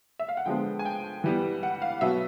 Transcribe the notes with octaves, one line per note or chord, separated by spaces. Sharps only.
E5
F5
F#5
D3 F3 G#3 B3 G5
G#5
G5
E3 G3 B3
F#5
F5
B2 F#3 B3 E5